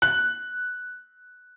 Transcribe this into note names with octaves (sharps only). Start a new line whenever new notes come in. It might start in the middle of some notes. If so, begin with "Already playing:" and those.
F#6